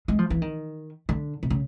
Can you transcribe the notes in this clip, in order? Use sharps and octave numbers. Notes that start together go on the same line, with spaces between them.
G#3
F3
E3
D#3
D3
C3
C#3